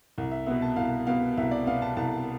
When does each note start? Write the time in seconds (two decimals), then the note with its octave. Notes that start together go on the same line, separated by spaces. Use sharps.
0.18 C2
0.31 E5
0.46 B2 B3 E5
0.62 A5
0.76 C2 F5
1.07 B2 B3 F5
1.37 C2 E5
1.51 D5
1.66 B2 B3 F5
1.82 A5
1.97 C2 A5